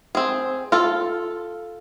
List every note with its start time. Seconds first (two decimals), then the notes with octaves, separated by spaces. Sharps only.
0.15 C4 G#4
0.72 F4 A4